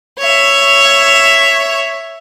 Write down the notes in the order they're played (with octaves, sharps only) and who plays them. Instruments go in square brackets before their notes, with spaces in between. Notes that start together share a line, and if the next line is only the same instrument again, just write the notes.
[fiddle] C#5 E5